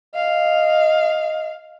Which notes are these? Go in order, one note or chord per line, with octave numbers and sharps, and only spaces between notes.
D#5 F5